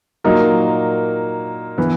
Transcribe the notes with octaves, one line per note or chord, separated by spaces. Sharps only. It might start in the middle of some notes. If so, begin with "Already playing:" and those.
A#2 F#3 A#3 D#4 A#4
E3 B3